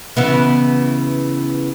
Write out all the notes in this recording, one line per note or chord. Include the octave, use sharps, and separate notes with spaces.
C#3 E3 B3